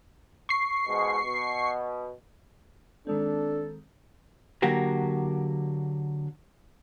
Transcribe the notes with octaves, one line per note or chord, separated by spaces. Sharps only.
C#6 C7
G#2 B2 G#3
B2
D#3 G#3 C4 D4 A4
D3 F#3 A#3 F#4 G4